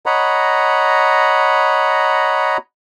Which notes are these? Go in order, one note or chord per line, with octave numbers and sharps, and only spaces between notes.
C#5 D#5 F#5 A#5 B5